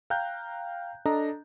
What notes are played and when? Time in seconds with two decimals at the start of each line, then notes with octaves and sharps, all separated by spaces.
0.10 F5 G5 A#5 F#6 G6
1.05 D4 A4 D#5 A#5